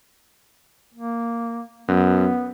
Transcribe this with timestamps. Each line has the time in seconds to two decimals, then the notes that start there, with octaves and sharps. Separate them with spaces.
0.94 A#3
1.88 F#2 B3